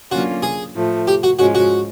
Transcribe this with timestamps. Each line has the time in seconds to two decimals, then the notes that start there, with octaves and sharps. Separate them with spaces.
0.11 D3 F#3 A#3 C#4 F4 F#4
0.42 G#4
0.75 A2 F3 A3
1.07 G4
1.23 F#4
1.39 G#2 F3 G#3 C#4 F#4
1.55 F#4